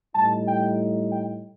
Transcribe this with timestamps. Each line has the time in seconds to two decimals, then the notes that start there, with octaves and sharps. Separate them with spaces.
0.15 A2 G3 D#4 A5
0.47 G5
1.12 G5